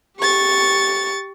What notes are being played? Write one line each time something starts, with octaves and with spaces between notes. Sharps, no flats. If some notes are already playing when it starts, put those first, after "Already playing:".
G4 C#6 A6